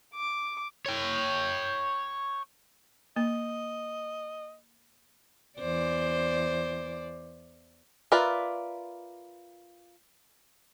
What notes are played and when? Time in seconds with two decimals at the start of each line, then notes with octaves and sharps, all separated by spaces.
0.15 D6
0.86 C#5 G5
3.16 A#3 D#5
5.59 E2 C5 D5
8.12 F4 A#4 B4 D5 E5